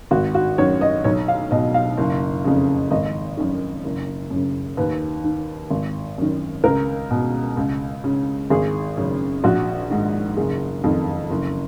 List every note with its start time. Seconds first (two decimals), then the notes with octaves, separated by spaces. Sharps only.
0.11 G#1 F#4
0.34 F#4
0.58 F#2 D#3 C#5
0.81 D#5
1.04 B1 C#5
1.28 F5
1.51 B2 D#5
1.74 F5
1.97 F#1
2.44 F2 C#3
2.91 G#1 D#5
3.37 F#2 D#3
3.84 F#1
4.30 F#2 C#3
4.77 D#2 B4
5.24 D#3
5.71 G#1
6.18 F#2 D#3
6.64 C#2 A#4
7.11 B2
7.57 C#2
8.04 C#3
8.50 G#1 G#4
8.97 F#2 C#3
9.44 A#1 F#4
9.90 G#2 D#3
10.37 F#1 G#4
10.84 F2 D#3
11.30 F#1